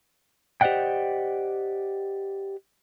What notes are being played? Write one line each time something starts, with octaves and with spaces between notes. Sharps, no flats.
G4 C5 D5 D#5 F#5 G5